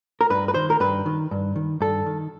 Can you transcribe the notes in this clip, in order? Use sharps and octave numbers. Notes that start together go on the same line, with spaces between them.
A#4
G2 B4
B4
D#3 C5
A#4
G2 B4
D#3
G2
D#3
G2 A4
D#3